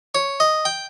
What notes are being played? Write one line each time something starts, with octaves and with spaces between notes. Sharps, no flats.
C#5
D#5
G5